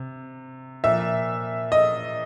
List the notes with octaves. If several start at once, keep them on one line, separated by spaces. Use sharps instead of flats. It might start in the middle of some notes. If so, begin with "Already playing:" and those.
Already playing: C3
A#2 F3 E5
D#5